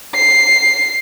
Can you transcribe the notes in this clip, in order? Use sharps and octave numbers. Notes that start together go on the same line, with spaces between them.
C7